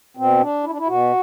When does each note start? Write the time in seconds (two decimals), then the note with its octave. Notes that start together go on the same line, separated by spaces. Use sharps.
0.17 B2 C4
0.41 D4
0.64 E4
0.71 D4
0.78 E4
0.87 B2 F#4